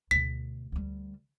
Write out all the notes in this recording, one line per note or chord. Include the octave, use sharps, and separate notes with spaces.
D2 B2 B6
D2 G3